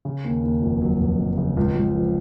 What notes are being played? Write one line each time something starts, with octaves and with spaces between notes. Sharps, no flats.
C#3
D#2
D#2
F1
F#3
F1
F1
C#3
C#2
C#2
F3